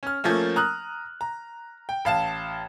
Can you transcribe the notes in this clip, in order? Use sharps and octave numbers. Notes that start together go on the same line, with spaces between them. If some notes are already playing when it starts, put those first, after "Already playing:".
C#4 F6
F3 A3 A#3 C#4
A#5 D#6 F6 F#6
A#5
G5
A1 F5 A5 E7